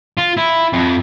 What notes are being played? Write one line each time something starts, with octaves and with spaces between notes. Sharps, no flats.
F4
E4
F2